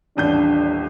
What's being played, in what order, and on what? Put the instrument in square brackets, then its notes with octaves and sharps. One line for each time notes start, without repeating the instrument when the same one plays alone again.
[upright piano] D#1 A1 G6 [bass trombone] D4